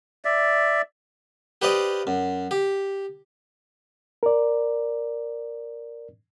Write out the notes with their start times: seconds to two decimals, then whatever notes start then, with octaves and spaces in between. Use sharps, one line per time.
0.25 D5 E5
1.62 G4 B4 C5 D5 D#5 F5
2.07 F#2
2.51 G4
4.23 A#4 D5